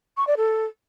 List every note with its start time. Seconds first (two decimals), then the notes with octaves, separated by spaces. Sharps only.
0.17 C#6
0.27 D5
0.37 A4